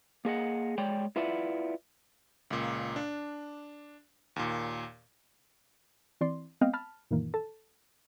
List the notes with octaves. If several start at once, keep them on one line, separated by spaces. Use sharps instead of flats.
A#3 G#4 D#5 F#5
G#3 C#5 D5 G5
E4 F4 B4 D5 E5 F#5
C#2 A#2
D4
D#2 A#2
E3 C4 D5 C6
G#3 B3 C4 D#5 F5 G5
A5 B5 F6
F#2 A#2 D#3 E3 A#3
A4 A5